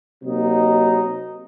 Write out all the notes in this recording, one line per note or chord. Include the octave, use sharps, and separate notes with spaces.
C3 F#3 A#3 D#4